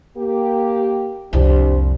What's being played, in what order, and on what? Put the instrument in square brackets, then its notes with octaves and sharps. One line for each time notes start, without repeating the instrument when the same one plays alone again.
[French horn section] A#3 G4
[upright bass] C2 F2 [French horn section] D4 G4 C5